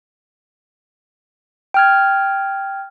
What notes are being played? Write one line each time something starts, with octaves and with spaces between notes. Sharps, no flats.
G5 F6 G#6